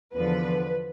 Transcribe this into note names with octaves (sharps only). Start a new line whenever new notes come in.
E2 D3 F3 B4